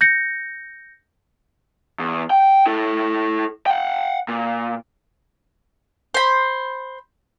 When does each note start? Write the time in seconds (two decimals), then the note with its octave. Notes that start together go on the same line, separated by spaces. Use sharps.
0.01 G6 A#6 C#7
1.99 E2
2.30 G5
2.66 E4 A4
3.66 F#5 G5
4.28 A#2
6.14 C5 B5